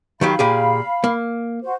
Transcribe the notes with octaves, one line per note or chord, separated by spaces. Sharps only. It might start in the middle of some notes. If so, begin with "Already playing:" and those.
D#3 F#3 G4 F5 B5
A#2 G4 G#4
A#3
F#4 C5